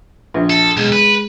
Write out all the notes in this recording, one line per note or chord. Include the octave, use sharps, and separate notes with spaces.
A#1
A4
B1 G#3
B4